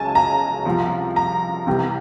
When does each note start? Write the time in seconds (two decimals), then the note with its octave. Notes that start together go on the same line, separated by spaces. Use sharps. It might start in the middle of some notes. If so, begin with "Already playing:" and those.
Already playing: C#2 C#3 F#3 G#5 A5
0.15 A#5
0.65 C2 C3 F3
1.16 A#5
1.66 C2 C3 E3 G3